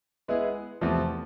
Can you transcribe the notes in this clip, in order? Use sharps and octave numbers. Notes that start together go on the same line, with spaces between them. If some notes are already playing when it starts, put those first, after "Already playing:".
G#3 B3 E4 G#4
E2 C3 F3 A3